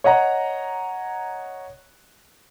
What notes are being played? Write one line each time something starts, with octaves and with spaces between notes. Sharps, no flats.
C#5 D#5 F#5 A#5